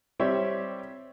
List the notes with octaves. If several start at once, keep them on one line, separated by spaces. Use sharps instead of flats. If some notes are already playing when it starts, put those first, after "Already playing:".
G3 C4 G4 C#5 E5